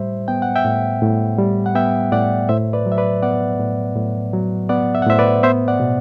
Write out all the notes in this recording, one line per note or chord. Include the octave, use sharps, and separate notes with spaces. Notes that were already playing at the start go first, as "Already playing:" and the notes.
Already playing: A2 G3 C5 E5
B3 G5
F#5
E5 G5
A2
A2
G3
F#5
B3 E5 G5
A2 D5 F#5
A2 C5 E5
B4 D5
F#3
E5
B4 D5
B3 D5 F#5
A2
A2
F#3
B3 D5 F#5
E5
F#5
A2 C5 E5
B4 D5
B3 C5 E5
D5 F#5
B2